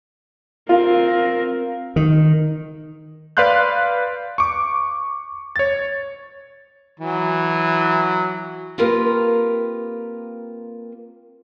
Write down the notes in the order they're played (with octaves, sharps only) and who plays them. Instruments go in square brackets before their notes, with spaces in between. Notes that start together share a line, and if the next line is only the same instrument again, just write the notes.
[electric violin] C4 A#4 [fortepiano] F4
[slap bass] D#3
[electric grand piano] B4 D5 F5 C6 F#6 G6
C#6 D6
C#5 A6
[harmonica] E3 F#3
[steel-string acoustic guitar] A#3 C4 F4 G4 A#4 B4